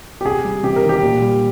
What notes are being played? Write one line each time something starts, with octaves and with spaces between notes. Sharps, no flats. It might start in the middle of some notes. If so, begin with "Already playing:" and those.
G4
C3 G#4
G3
C3 G4
A#4
D#3
G4
A#2
G3